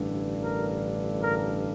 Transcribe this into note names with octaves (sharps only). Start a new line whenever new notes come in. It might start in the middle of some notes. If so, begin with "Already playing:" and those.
Already playing: A1 G2 D3
A#4
A#4